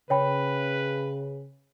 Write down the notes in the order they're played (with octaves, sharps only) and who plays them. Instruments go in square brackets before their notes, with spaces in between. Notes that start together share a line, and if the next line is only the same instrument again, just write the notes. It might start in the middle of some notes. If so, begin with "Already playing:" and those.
[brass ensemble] C#3 [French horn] B4 [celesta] C#5 G5 B5